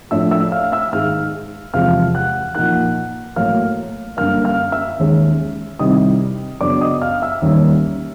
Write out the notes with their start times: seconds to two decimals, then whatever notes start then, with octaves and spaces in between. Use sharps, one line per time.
0.11 A2 F3 A3 D4 E5 E6
0.31 E5 E6
0.52 F5 F6
0.72 E5 E6
0.92 G#2 D#3 G#3 F5 F6
1.74 E2 C3 F3 G#3 F5 F6
2.15 F#5 F#6
2.55 A#2 F3 A#3 D#4 F#5 F#6
3.36 A2 F#3 A#3 F5 F6
4.17 F#2 D3 G3 A#3 F5 F6
4.44 F5 F6
4.72 E5 E6
4.99 D#2 D#3 G#3 C#4
5.79 C3 D#3 G3 C4 E4 D#5 D#6
6.61 F#2 C#3 F#3 B3 D4 D5 D6
6.81 D#5 D#6
7.02 F5 F6
7.22 E5 E6
7.42 D#2 D#3 G3 A#3 C#4